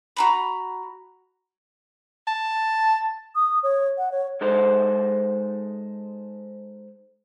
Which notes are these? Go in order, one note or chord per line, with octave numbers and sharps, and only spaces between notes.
F#4 A#5 B5
A5
D#6
C#5
F#5
C#5
G#3 D#4 A4 C5